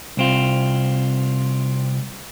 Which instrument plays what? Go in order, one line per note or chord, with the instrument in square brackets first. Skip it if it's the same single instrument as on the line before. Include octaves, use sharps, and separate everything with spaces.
[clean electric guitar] C2 C4 F4